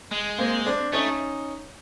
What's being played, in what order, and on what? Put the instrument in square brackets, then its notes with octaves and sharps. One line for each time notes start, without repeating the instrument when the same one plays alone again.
[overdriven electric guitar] G#3
[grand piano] A#3 C4
C4 D4
[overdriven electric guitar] A3 [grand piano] C#4 D#4